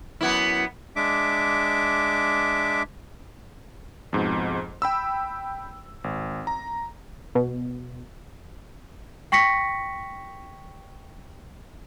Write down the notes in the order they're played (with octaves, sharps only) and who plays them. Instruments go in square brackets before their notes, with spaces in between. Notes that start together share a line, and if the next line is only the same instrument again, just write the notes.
[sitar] F#2 B3 E4
[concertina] G#3 D4 E5 D6
[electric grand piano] F2 G#2 B2
G5 B5 E6
G#1
A#5
[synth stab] B2
[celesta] G5 C#6 A#6 B6 C#7